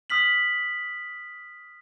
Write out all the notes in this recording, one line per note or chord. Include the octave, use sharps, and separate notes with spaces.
D#6 F6 B6 F#7